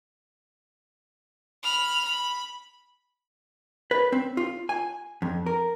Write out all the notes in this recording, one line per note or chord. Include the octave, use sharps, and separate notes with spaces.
B5 F6
B5
B4
C4
F4
G#5
F2
A#4